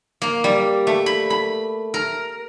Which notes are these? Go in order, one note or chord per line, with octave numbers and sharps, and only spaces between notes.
A#3
G3
A3
B5
B5
A#4